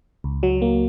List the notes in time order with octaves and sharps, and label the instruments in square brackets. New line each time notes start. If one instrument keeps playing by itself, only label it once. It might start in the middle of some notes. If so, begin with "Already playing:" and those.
[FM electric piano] C#2
F#3
A#3